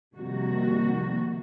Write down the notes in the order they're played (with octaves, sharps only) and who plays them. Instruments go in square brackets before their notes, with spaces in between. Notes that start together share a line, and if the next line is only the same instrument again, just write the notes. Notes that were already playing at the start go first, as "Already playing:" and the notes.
[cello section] F2 C3 D#3 G3 A#3 F#4